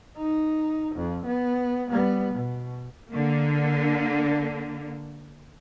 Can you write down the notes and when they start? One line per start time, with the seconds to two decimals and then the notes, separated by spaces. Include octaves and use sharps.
0.17 D#4
0.96 F2
1.26 B3
1.91 G3 B3
2.34 B2
3.12 D3 A#3